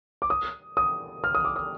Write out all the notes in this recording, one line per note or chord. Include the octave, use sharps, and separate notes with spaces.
D6
D#6
D#6
F6
D#6
D6
D#6